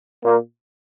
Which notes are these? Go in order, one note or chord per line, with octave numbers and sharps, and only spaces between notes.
A#2 A#3